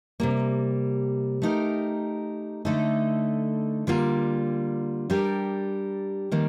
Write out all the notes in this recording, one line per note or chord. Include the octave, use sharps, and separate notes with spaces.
C3 G3 A#3
A3 D#4 G4 A#4
D3 A3 D#4 A4
D3 G3 A#3 F4
G3 D4 G4 A#4
D#3 G3 A#3